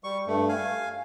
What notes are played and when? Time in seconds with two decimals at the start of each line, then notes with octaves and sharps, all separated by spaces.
0.04 G3 C#6
0.27 G2 A3
0.49 F5 G#5